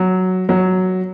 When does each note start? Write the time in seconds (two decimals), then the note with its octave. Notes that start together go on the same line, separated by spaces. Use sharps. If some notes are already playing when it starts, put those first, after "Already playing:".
Already playing: F#3
0.49 F#3